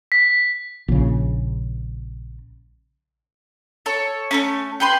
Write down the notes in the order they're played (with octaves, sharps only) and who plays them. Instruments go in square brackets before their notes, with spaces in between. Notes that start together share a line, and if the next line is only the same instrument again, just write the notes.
[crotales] B6
[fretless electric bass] A#1 C#3
[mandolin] A4 C#5
A3 A#3 C#4
G4 B4 C6